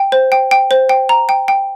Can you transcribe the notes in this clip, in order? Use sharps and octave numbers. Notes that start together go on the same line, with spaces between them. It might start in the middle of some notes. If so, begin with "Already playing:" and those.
Already playing: G5
C5
G5
G5
C5
G5
A#5
G5
G5